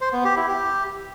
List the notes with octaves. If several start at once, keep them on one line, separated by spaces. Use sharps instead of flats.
C5
B3
G4
E4
G4